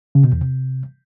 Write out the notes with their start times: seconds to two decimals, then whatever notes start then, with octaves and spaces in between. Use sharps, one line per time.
0.15 C#3
0.24 B2
0.32 E2
0.41 C3